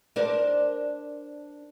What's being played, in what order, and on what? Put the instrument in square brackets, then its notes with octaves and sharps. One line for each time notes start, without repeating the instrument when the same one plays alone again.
[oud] D4 A#4 C5